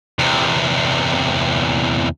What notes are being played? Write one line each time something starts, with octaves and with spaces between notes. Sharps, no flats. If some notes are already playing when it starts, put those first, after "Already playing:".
E2 C3